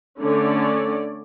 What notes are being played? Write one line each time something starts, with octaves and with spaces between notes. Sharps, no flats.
D3 A3 C#4 C#5 D5